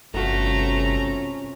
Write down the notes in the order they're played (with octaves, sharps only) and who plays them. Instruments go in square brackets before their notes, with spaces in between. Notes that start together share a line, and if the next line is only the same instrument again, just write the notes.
[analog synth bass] G1 [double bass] C3 C#4 [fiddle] A3 A#5 [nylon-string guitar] F4 F#4 A4